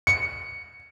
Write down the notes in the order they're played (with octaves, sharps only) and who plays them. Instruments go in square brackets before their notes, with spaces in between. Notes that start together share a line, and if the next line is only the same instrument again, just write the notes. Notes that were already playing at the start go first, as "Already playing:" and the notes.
[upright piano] C#7